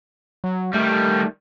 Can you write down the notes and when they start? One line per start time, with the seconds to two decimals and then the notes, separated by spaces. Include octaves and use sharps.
0.44 F#3
0.74 D#3 G3 A3